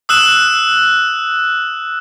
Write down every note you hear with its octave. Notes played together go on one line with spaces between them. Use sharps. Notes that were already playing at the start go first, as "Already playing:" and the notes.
D#6 E6 F#6 E7